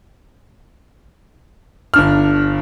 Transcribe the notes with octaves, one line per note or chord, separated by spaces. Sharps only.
G1 D4 F6